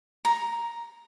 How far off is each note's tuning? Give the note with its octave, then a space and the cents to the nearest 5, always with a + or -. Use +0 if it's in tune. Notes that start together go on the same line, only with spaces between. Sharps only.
A#5 +5